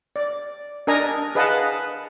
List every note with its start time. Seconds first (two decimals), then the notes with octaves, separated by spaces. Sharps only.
0.16 D5
0.87 D4 A#4 D#5 G#5 A#5
1.35 G#4 B4 D#5 F5 F#5 A5